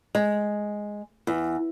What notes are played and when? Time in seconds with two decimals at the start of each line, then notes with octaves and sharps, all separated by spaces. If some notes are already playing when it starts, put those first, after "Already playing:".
0.15 G#3
1.27 E2